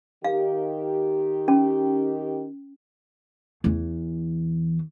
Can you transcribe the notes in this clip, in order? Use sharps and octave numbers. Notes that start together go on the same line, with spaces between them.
D#3 G4 F5
C#4
E2 E3